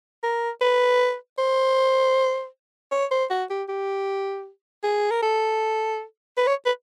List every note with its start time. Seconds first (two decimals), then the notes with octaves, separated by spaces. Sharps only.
0.23 A#4
0.61 B4
1.38 C5
2.92 C#5
3.11 C5
3.30 F#4
3.50 G4
3.69 G4
4.84 G#4
5.11 A#4
5.22 A4
6.37 B4
6.47 C#5
6.66 B4